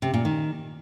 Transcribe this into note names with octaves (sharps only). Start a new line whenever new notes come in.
C3
A#2
D#3